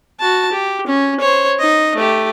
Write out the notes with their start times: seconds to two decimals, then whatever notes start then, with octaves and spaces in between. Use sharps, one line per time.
0.20 F#4 A5
0.52 G4
0.87 C#4
1.20 C5 C#5
1.59 D#4 D#5
1.96 A3 G4